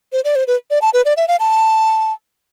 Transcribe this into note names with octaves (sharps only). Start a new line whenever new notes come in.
C5
D5
C5
B4
D5
A5
B4
D5
E5
F5
A5